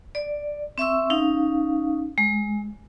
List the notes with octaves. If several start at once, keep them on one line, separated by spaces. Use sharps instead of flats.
D5
C4 E5 C#6 E6
C#4 D#4 F5
G#3